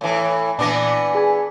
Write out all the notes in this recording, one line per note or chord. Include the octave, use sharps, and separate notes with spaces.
A2 E3
A#2 E3 B3 D4 D6 A#6
G#4 G#5